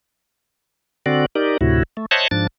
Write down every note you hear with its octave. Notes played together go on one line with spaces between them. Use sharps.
D3 C4 F#4 D5
D#4 G4 A#4 D5
D2 A2 C3 E4 F#4
A3
C5 C#5 D#5 E5 F#5 A5
G#2 F3 D4 A6